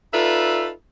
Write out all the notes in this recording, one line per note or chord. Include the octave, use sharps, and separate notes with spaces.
D#4 F4 A4 B4 D5 E5